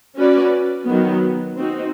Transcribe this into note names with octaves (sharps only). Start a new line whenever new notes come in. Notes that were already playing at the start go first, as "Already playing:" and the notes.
C#4 F#4 B4 D5
D#3 F#3 B3
C4 D#4 F#4